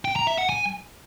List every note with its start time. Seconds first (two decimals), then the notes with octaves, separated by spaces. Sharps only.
0.05 G5
0.16 A#5
0.27 E5
0.38 F#5
0.49 G#5